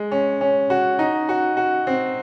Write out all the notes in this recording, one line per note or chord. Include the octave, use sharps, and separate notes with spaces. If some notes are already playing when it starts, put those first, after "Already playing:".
Already playing: G#3
C#4
C#4
F#4
D#4
F#4
F#4
C4